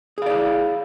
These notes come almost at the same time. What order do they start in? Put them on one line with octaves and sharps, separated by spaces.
G#4 F5 D5 E4